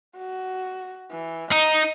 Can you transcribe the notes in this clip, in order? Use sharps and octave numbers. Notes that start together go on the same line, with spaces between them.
F#4
E3
D#4 D#5